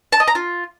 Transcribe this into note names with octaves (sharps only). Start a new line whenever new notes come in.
A5
D#5
A#5
F4